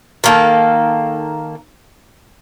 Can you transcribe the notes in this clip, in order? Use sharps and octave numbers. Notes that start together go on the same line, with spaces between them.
D#3 A#3 A4